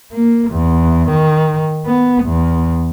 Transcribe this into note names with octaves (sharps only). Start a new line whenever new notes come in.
A#3
E2
D#3
B3
E2